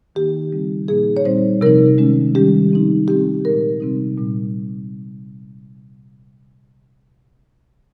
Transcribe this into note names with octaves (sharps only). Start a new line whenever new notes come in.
D#3 A#3 D#4 G4
C#3 G3 C4 D#4
A#2 F3 A#3 D#4 G#4
C#5
A#2 G3 C4 D#4 C5
C3 F3 C4 D#4 A#4
D#3 G#3 C#4
D#3 G3 C#4 G4
F3 C4 D#4
F3 C4 D#4 G4
A#2 G#3 D#4 A#4
C3 G3 C4 D#4
A#2 G3 C4